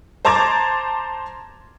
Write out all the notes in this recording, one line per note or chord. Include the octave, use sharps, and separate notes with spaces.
C5 A5 A#5 D6 G#6 A6